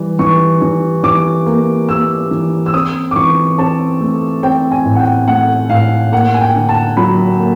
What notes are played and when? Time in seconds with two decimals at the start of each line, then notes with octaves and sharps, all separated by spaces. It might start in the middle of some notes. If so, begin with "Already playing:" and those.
Already playing: E3 G3
0.19 E3 C#6
0.62 E3
1.03 E3 D6
1.46 A#3
1.89 A#3 E6
2.31 E3
2.66 E6
2.73 C4 D#6
3.11 D6
3.16 E3 C#6
3.58 C4 A5
4.01 A3
4.43 C4 G5
4.72 G#5
4.85 A2
4.95 F#5
5.00 G5
5.28 A3 F#5
5.70 A2 F5
6.12 A#3 F#5
6.34 G#5
6.41 G5
6.55 D3
6.69 A5
6.97 F#3 B5
7.39 A#3